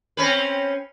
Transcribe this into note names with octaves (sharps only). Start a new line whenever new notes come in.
C4 C#4 B4